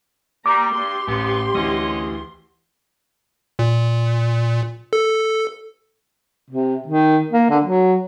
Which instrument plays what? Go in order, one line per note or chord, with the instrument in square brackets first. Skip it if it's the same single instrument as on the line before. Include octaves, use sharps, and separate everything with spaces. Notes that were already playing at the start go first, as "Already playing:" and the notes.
[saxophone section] G3 [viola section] A#3 A#5 [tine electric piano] D6
[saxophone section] G2 [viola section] G4 C6
[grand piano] A1 [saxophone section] C3 E3 B3
[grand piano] D2 E3 [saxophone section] C#4 D#5
[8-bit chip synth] A#2
A4
[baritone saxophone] C3
D#3
A#3
D3
F#3